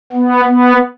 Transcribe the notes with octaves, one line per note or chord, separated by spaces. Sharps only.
B3
B3